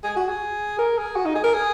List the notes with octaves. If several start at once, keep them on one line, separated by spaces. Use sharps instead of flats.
G#4
F#4
G#4
A#4
G#4
F#4
D#4
G#4
A#4
G#4